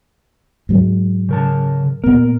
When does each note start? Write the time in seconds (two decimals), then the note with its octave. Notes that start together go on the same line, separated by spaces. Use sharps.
0.69 G#2 F#3 G#3
1.29 C#3 A#4 A5
2.04 A#2 B3 A#4